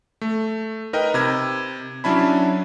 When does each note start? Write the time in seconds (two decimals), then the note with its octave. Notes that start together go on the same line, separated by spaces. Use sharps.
0.21 A3
0.93 D#4 A#4 B4 D#5 G5
1.14 C3 B5 G#6
2.04 F#3 C#4 D4 E4 A5 B5